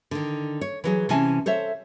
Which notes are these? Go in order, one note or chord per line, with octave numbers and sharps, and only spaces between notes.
D3 D#3
C#5
E3 F#3 G#4
C3 E3 C#4 G#5 A5
A4 C5 C#5 E5